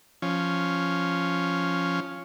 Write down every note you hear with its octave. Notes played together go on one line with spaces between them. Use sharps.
F3 C#4